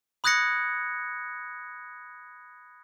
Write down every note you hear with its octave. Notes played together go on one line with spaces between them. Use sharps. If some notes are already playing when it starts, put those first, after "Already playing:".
B5 D#6 F#6 G#6 A#6 C#7